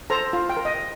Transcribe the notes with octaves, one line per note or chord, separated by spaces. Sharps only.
A4 C5 A#5
F4
G5
A#4
D#5